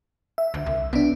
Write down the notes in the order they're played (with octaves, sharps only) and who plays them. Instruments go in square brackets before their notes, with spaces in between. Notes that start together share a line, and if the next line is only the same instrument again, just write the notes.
[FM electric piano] E5
[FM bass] D2
C2
[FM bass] B1 [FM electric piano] B3 D4